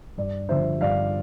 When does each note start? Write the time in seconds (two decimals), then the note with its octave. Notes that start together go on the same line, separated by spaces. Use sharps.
0.17 G2 D5
0.49 D3 F3 C5 E5
0.81 G2 D5 F5